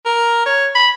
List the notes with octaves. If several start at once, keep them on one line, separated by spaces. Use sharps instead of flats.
A#4
C#5
B5